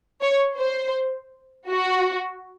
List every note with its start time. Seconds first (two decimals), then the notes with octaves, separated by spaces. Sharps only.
0.22 C#5
0.58 C5
1.70 F#4